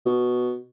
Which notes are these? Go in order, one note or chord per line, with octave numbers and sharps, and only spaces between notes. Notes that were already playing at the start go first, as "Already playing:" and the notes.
B2